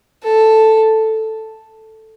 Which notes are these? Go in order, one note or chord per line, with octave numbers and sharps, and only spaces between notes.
A4